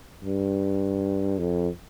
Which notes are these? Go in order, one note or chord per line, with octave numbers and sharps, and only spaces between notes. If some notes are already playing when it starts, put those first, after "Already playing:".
G2
F2